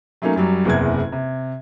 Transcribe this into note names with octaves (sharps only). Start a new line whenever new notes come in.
F#3 A3 A#3 C#4 D#4
F#2 F#3 G3
F#1 E2 C3 E3 G#6
C3